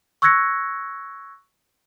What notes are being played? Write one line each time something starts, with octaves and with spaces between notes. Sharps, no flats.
C#6 E6 F#6 G#6 A#6 C#7